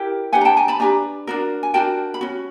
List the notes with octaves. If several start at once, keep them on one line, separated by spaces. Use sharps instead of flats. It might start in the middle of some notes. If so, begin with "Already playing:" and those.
Already playing: E4 G4 A#4
D4 G4 B4 F#5 G#5
A#5
G5 A5
G#5 A#5
A5 B5
D4 G4 B4 G#5 A#5
D4 F#4 A#4
G#5
D4 F#4 A#4 G5 A5
B5
C#4 F#4